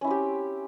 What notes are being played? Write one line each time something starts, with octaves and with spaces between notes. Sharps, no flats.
C4 C#4 E4 G4